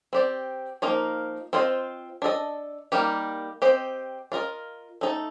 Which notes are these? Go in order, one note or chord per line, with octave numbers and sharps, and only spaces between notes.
C4 G4 D5
F3 A#3 D#4 A#4
C4 F4 C5 D#5
D4 A4 D#5
G3 A#3 D#4 G4
C4 G4 C5 D#5
D4 F4 A#4 D#5
A3 D#4 A4